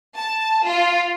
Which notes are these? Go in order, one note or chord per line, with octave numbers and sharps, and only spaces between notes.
A5
F4